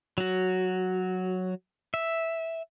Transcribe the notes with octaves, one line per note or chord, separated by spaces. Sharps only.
F#3 F#4
E5